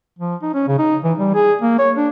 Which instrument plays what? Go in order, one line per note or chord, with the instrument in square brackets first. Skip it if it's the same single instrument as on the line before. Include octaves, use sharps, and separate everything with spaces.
[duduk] F3
D#4
C#4
C#3
D#4
E3
G3
G#4
A#3
C#5
D4